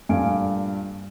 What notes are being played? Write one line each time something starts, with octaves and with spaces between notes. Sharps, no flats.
G2 A#2 A3 F5 G#5 D7